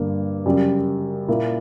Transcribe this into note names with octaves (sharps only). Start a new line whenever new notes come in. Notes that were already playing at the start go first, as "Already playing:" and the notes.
Already playing: G2 D3 A#3
F#2 C#3 G3
A#2 A#3 E4